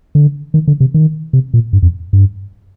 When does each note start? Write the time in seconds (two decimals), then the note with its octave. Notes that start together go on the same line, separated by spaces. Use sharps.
0.15 D3
0.54 D#3
0.68 D3
0.80 C3
0.94 D#3
1.33 C3
1.54 A#2
1.73 G2
1.83 F2
2.13 G2